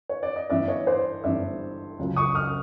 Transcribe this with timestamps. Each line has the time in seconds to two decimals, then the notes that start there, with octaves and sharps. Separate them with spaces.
0.09 C#5
0.23 D5
0.36 D#5
0.50 G1 G2 E3 D5 E5
0.68 C#5 D#5
0.87 C5 D5
1.24 G1 G2 E3 D5 E5
1.99 C#2 C#3 F#3
2.16 C#6 D#6
2.35 D#6 F6